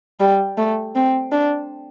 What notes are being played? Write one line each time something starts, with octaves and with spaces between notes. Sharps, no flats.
G3
A3
C4
D4